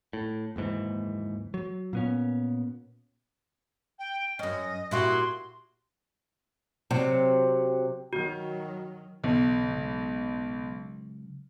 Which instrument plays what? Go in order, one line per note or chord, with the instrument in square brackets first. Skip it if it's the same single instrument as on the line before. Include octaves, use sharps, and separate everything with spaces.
[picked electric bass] A2
F#1 D#2 G#2 E3
F#3
A#2 B3 C#4
[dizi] G5
[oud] F#2 C#4 [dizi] D#5
[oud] A#2 E4 G4 [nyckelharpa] F#4 [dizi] C6
[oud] C3 F#3
[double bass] D#3 F#3 [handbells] F#4
[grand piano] B1 [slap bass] C#3 E3 B3
[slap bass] C#3 F#3 G#3